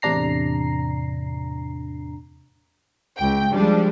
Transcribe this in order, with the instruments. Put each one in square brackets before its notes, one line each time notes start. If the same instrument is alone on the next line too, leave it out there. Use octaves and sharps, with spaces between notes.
[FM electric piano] E2 A2 C3 D4 A#5 C7
[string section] C#2 G5
F3 G3 G#3 D4